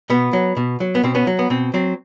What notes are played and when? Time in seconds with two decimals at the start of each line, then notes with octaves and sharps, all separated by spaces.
0.10 B2 B3
0.33 F#3
0.57 B2
0.80 F#3
0.95 B3
1.04 B2 C4
1.15 B3 C#4
1.27 F#3
1.39 B3
1.50 B2 C4
1.74 F#3 C4